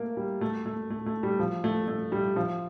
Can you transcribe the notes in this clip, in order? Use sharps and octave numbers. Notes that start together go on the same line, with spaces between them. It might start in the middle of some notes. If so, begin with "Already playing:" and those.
Already playing: A3 A#3
G3
A3
A3
A3
A3
G3
F3
A3
A3
G3
F3